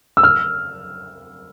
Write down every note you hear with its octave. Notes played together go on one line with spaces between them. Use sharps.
E6
F6